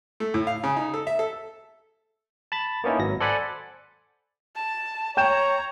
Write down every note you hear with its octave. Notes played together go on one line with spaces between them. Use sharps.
A3
A2
F5
C#3
D#4
A4
E5
A4
A5 B5 A6
A#3 B3 C#4 D#4 E4
G#1 F#3 A#6
A4 C5 D5 F#5 G#5 B5
A5
C#5 G5 A#5 G6 E7